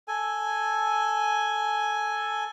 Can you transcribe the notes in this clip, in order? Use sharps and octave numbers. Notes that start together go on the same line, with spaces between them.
A4 G#5